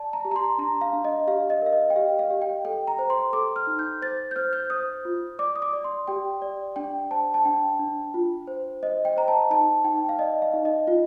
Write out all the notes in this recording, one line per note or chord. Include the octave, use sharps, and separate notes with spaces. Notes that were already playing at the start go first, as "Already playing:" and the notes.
Already playing: D5 A5
A#5
G4
A#5
C6
D4 A#5
F5
D4
D#5
G4 F5
D#5
A#4 F5
D#5
G5
G4 F5
F5
G4
G5
A4 G5
A#5
C5
C6
A4 D6
F6
D#4
G6
C5 A6
G6
C5 F6
G6
C5 D#6
F4
D5 D6
D#6
D6
D5
C6
G4 G5
D5
D4 G5
C5 A5
A5
D4 G5
D4
F4
C5
C5 D#5
G5
C5 A#5
A5
D#4 A5
D#4 G5
G5
F5
D5 D#5
F5
D#4
D#5
F4